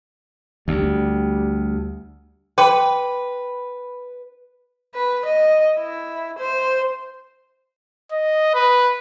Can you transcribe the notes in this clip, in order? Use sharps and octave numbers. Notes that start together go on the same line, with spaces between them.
D2 G3
B4 G5 C6 D6
B4
D#5
E4
C5
D#5
B4